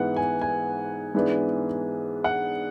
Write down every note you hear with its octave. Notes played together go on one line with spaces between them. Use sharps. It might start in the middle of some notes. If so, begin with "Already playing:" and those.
Already playing: G#2 E3 G#3 B3 F#5
G#5
G#5
G#2 E3 B3 D4
F#5